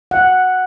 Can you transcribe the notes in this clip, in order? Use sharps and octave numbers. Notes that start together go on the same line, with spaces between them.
F#5